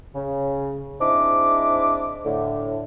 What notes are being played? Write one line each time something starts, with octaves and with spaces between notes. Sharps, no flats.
C#3
G#2 C4 D4 E4 D#5 D6
A2 D3